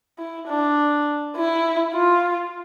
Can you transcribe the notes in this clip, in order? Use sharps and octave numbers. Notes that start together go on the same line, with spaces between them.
E4
D4
E4
F4